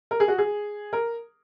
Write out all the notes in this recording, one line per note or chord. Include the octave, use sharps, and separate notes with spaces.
A#4
G#4
F#4
G#4
A#4